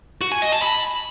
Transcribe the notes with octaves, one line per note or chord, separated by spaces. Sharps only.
F#4
G#5
D#5
A5
B5